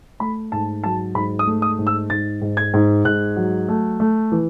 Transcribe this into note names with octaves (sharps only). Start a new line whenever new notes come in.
A3 B5
G#2 A5
F#3 A5
G#2 B5
D#6
A3
D#6
G#2
E6
G#2 A6
G#2
G#6
G#2
G#2 F#6
F#3
A3
A3
E3